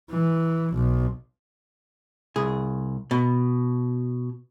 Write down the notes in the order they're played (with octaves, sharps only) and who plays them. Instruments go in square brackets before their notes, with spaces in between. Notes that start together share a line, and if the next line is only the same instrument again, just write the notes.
[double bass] E3
B1
[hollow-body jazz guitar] C2 G#4
B2